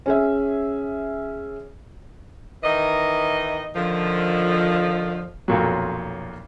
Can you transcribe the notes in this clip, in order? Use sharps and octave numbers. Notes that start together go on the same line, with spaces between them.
C#4 G#4 E5
D#3 E3 D#5
D3 D#3 F3
B1 F2 A#2 F#3